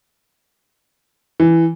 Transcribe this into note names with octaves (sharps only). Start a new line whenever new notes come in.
E3